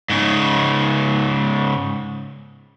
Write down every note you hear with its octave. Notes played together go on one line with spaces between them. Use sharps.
G#2 C#3